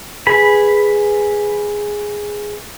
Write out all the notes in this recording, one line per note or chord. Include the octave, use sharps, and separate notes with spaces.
G#4 B4 B5